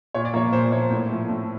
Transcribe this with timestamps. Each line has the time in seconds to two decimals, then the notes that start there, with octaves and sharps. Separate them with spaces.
0.14 A#2 C#5
0.25 D5
0.34 F3 A#3 C#5
0.53 A#2 C5
0.72 F3 A#3 C#5
0.90 A2
1.10 F3 A3
1.29 A2